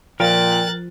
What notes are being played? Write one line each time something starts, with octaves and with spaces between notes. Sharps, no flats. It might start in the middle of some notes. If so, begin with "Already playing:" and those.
A#2 F3 A#4 G5 F#6 A6